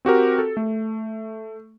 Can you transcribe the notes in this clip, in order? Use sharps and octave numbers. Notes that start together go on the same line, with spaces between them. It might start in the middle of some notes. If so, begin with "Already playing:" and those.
C4 F#4 G4 A#4
A4
A3